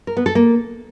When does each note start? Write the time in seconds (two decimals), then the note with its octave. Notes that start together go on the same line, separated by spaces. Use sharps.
0.07 A#4
0.17 B3
0.26 A4
0.35 A#3